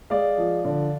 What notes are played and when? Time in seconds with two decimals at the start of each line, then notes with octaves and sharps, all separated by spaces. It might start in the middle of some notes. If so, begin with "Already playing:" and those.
0.10 G#3 D5 F5
0.38 F3
0.65 D3